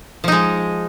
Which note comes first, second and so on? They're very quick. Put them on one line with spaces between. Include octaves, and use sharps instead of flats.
F3 D#4 G#3